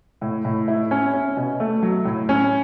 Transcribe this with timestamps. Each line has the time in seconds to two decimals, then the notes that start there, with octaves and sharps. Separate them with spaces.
0.21 A2
0.45 A2
0.68 E4
0.91 C#4
1.14 C#4
1.37 B2
1.60 A3
1.83 F#3
2.05 A2
2.29 C#4